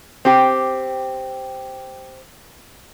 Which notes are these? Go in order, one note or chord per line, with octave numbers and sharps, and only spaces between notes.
C4 G4